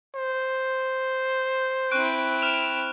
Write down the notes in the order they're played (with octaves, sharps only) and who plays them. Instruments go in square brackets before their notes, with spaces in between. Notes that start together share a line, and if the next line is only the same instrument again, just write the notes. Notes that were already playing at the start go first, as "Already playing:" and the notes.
[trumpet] C5
[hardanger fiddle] C4 E4 [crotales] C#6 F#6 D7
[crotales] F6 E7 F7